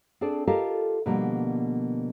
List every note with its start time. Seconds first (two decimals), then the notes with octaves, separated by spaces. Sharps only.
0.21 C4 D4 G#4 A4 D5
0.47 F4 G4 A4 A#4 D#5 F5
1.06 B2 D3 F3 G3 A#3